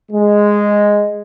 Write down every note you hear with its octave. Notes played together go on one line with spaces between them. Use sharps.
G#3